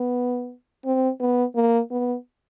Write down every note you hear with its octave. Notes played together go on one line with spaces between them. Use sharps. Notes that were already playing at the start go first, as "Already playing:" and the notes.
Already playing: B3
C4
B3
A#3
B3